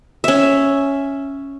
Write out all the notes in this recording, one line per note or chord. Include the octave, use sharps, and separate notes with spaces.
C#4 E5